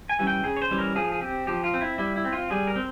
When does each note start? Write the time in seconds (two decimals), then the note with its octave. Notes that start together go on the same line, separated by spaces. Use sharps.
0.09 G#5
0.19 E3 G3 C#4
0.27 G5
0.44 C#3 G#4
0.57 C#5
0.62 C5
0.71 E3 G3 C#4
0.78 A#4
0.95 F3 G#4
1.12 G#4
1.21 C4 G4
1.47 F3 G4
1.64 F4
1.74 C4
1.81 E4
1.98 G3 E4
2.16 E4
2.25 C4
2.33 F4
2.50 G3 G#4
2.67 A#4
2.76 C4